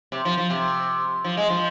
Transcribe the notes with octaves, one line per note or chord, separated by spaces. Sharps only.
C3
F3
F3
C3
F3
G#3
F3